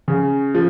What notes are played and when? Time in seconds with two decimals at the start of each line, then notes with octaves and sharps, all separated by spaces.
0.08 C#3
0.55 F3